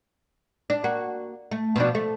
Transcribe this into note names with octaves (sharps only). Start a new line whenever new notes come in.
D4
A#3 F#4
A3
B2 F3 D4
A3